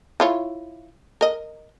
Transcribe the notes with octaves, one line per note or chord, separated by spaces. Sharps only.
E4 F4 C#5
A#4 D#5